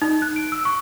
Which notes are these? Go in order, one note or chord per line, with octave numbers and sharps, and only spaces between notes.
D#4
F#6
D7
E6
C#6